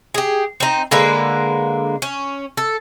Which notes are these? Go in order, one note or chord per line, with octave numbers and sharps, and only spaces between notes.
G4 G#4
C4 D#4
D3 G#3 A#3 B4
C#4
A4